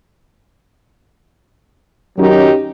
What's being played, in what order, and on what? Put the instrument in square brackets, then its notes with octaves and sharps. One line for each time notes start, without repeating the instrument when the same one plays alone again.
[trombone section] F#2 D#3 F#3 [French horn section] C#4 D#4 G4